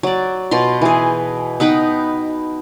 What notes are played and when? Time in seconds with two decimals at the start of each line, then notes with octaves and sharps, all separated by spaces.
0.03 F#3 D5
0.51 B2 F4 C6
0.81 E3 G#4
1.60 B3 D#4 B4 G5